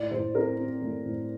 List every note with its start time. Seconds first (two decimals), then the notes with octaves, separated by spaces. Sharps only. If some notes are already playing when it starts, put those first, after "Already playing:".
Already playing: A2 D5
0.11 A2 C5
0.35 C4 A#4
0.57 C4
0.82 A3
1.05 A2